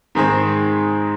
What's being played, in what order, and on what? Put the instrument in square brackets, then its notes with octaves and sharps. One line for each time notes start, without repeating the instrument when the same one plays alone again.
[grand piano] G#2 D#3 G#3 C4